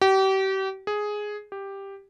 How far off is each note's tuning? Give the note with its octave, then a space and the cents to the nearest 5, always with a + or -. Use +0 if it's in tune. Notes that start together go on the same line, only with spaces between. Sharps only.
G4 -35
G#4 +5
G4 +5